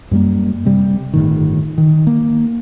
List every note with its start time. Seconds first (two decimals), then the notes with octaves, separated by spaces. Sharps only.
0.11 F#2 G3 A#3
0.65 C3 G3
1.13 G1 A2 D#3
1.78 D#3
2.07 A#3